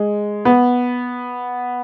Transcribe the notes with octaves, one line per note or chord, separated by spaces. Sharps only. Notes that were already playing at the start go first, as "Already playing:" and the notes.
Already playing: G#3
B3